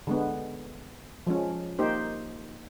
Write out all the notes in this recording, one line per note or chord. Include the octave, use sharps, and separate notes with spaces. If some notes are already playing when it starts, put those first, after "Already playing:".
D3 G#3 B3
F3 G#3 C#4
A#3 D#4 G4 C5